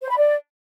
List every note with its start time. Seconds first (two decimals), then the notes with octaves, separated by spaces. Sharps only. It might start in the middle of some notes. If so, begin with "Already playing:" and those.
0.03 C5
0.10 B5
0.18 D5